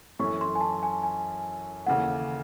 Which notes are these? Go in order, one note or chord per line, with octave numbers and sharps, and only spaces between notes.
F#2 E3 A3 C#4 C#6
C6
G#5
A5
G#5
G#5
D#2 C#3 E3 A3 F#5